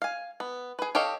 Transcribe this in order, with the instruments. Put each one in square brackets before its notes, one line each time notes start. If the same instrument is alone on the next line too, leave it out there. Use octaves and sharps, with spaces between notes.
[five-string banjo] F5 G#5
B3
G#4 B4
G4 A4 C#5 D#5 F5